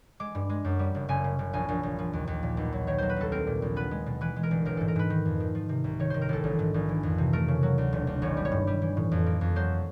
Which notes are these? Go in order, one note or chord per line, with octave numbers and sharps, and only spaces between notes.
G#3 D6
G2
G#3
F#2
G3
F#1
F#1 G#5
C#3
F#1
A#1 G#5
A#1
A#1
F3
D#2
D#2
A#2
B1
F#3
D#3 C#5
F#3 C5
B4
C2 A4
C4 A#4
A#2
A#1
B3 B4
G#3
B2
E3 B4
G#3
A#4
G1
A1 A#4
G#2 A4
A#4
G#2 B4
D#3
F2
D#3
F3
C3
C2
D#3 C#5
D#3 C5
A#4
A1 A4
A#1
G#2
A#1
E3
F2
C3
A3 A#4
C#3
F#3
D2
E1
D2
G#1 C#5
G3
C#5
G2
G3
E3
A2
F2
A#3
F2
F#3 C5